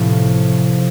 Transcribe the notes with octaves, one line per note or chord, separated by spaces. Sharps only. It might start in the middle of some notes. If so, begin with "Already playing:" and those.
Already playing: A2 C3 F3